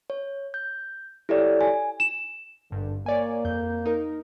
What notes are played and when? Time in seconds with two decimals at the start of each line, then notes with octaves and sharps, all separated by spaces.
0.10 C#5
0.54 G6
1.29 E4 G4 A4 C#5 D5
1.61 G#5
2.00 E7
2.71 G#1 G2 D3
3.06 A#3 C#5 D5 G#5
3.45 F2 G6
3.86 D#4 A#4